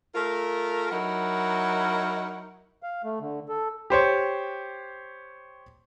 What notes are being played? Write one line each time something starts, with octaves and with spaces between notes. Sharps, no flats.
A3 F4 A#4
F#3 D#4 E4 A#4 F#5
F5
A3
D3
A4
G4 C5 C#5